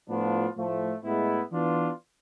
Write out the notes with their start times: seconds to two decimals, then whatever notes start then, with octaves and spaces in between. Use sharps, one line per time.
0.09 A2 F3 B3 D4 F4
0.57 A2 F3 A3
1.04 A2 G#3 B3 E4
1.52 E3 B3 D4 F4